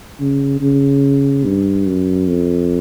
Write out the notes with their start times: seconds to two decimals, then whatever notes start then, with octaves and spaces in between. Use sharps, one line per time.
0.20 C#3
0.61 C#3
1.45 G2
1.87 F#2
2.28 F2